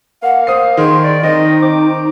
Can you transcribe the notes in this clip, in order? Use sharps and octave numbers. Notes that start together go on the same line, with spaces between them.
A#3 F5 F#5
C5 D#6 C7
D#3 G#4 C6
D5
D#3 C4 D#4 D#5
C4 D6